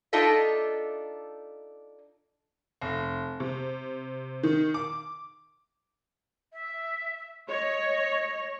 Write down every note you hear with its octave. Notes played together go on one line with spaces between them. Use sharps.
D4 D#4 F4 A4 D#5 E5
F1
C3
D#3
D6
E5
C#5 D#5